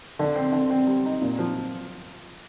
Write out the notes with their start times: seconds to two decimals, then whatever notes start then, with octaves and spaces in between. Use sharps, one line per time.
0.19 D3
0.36 C4
0.52 D3
0.70 C4
0.87 G3
1.05 D#4
1.21 A#2
1.39 F3